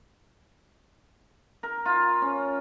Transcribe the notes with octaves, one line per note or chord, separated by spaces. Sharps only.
A#4
F4
C#4